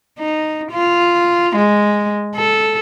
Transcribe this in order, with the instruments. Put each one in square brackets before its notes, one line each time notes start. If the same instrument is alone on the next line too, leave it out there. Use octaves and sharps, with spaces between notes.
[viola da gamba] D#4
F4
G#3
A4